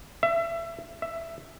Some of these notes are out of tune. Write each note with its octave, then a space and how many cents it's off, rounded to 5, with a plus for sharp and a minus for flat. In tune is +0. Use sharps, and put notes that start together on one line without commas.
E5 +25
E5 +10